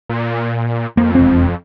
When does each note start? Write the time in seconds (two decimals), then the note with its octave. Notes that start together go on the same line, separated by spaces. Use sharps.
0.09 A#2
0.97 F2 A#3
1.15 E1 C4